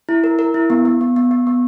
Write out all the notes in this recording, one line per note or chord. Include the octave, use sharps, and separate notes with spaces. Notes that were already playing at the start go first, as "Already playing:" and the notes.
E4
A#4
A#4
E4
B3
B3
B3
B3
B3
B3